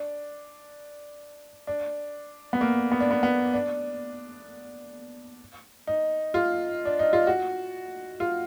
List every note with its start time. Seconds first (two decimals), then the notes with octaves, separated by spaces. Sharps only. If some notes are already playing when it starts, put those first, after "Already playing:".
Already playing: D4
1.67 D4
2.53 B3
2.61 A#3
2.92 B3
3.00 D4
3.11 B3
3.23 B3
3.53 D4
5.87 D#4
6.34 F4
6.85 D4
6.99 D#4
7.13 F4
7.27 F#4
8.20 F4